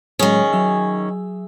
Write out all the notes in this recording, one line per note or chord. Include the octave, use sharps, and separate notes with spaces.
A2 D#3 F#3 G#3 C#4 G#4
F#3 E5 E6